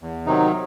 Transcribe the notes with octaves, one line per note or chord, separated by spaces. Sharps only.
E2
C3 D#3 F#3 D#4